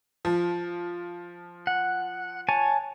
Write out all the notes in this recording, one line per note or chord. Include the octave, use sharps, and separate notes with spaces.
F3
F#5
C#5 G#5 A5